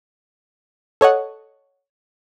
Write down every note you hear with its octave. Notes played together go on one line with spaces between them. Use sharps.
A4 C#5 D#5 F#5